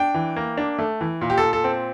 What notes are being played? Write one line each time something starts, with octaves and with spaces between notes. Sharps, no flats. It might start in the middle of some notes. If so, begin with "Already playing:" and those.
Already playing: D4 G5
E3
A#3
D4
A3
E3
A#2
G4
A#2 A4
A4
C4